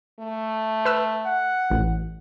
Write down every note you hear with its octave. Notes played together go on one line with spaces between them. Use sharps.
A3
B4 E6
F#5
A1